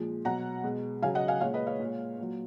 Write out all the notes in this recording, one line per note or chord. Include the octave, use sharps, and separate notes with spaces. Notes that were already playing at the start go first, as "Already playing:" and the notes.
Already playing: A#2 F3 G#3
B2 F#3 F#5 A#5
B2 G#3
C#3 F#3 F5 G#5
D#5 F#5
F5 G#5
A#2 G#3 C#5 F5
B4 D#5
C#5 F5
A#2 G#3
A#2 F#3